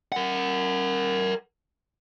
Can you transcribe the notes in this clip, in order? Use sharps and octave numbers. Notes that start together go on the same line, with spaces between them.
A#4 F#5